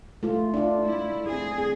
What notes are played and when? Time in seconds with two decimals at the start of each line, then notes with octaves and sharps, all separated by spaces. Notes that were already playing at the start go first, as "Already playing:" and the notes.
0.23 A3 F4
0.54 D4 F4
0.82 A3 E4
1.25 C4 G#4